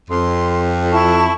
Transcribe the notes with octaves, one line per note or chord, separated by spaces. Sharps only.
F2 C6
E4 A5 C#6